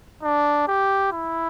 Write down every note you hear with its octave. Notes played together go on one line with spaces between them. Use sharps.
D4
G4
E4